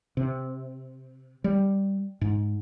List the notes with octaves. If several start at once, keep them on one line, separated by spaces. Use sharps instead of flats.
C3
G3
G#2